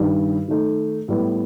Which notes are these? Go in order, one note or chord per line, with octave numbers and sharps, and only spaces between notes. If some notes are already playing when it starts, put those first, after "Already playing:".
Already playing: G2 D#3 G3
D#3 A3 D#4
A2 G3 B3